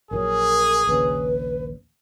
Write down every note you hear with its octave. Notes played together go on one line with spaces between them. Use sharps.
A#1 D3 F#3 G#4 A#4
A#1 D#2 C#3 B4